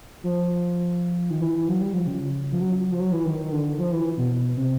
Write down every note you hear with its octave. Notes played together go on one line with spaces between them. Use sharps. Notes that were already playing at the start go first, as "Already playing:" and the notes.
F3
D#3
E3
E3
F#3
G3
F3
C#3
F3
F#3
F3
F#3
E3
D#3
D#3
D3
F3
E3
B2
C3